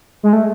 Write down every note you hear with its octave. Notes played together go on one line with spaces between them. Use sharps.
G#3
A3